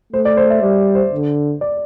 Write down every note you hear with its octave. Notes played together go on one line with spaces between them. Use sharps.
A3 C5
D5
C5
E5
G3 D5
C5
D3
D5